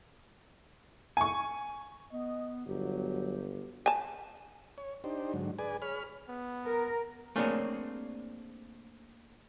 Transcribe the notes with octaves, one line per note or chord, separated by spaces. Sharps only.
G#5 C#6
B3 D#5
G1 F#3 G4
G#5 A5
C#5
D4 D#4 G4 C5
G#2 D3 F#3
G#4 B4 D5 G#5
G#4 C#5 B5 F6
B3
A#4
A3 A#3 C4 D4 G#4 C#5